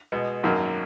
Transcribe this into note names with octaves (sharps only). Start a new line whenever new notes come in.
B2 G#3 B3
G#1 F#2 D#3 F#3 A#3